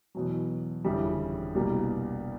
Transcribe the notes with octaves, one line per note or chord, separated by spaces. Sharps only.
E2 B2 F#3
G1 F2 C#3 E3 G3
C2 B2 G3 A#3